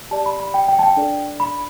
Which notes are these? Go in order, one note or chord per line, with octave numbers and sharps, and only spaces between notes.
G4 D5 A5
B5
B5
G5
G5
A5
G5
D4 A4 D5
B5